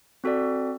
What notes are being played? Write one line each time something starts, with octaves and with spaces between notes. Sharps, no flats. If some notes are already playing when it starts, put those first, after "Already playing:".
C4 F#4 A4 D5